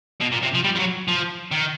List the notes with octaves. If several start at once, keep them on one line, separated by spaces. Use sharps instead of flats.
B2
A#2
C3
F3
G3
F3
F#3
F3
D#3